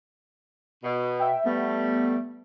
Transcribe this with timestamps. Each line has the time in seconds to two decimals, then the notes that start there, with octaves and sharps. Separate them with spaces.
0.84 B2
1.20 E5 G5
1.46 G3 A3 B3